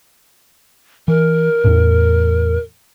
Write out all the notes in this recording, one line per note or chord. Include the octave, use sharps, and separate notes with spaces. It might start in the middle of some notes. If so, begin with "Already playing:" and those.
E3 A#4
E2 A2